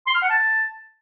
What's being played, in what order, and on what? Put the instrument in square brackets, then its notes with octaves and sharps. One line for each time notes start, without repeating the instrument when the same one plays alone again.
[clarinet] C6
F6
F#5
A5